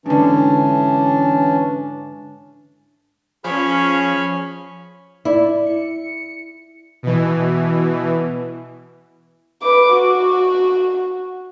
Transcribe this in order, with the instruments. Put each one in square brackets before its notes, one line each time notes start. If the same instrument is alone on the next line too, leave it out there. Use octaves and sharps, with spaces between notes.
[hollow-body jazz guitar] G#2 D3 [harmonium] E3 C#4 [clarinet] D4
[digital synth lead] F3 [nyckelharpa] C#4 C#5 [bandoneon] G#4 B5 F6
[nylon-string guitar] E4 [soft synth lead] D5
[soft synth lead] C#7
[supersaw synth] B2 E3
[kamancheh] B4 D6
F#4